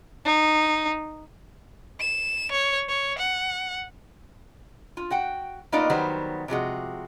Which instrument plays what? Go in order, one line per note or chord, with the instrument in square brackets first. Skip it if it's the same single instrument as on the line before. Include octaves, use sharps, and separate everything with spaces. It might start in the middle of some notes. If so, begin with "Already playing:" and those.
[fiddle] D#4
[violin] E7
C#5
C#5
F#5
[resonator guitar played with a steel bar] F4
F#4 F#5 G5
A#3 B3 D#4 F4 D5 D#5
D#3 F#3 G3 B3 C5
C3 F3 G#3 F#4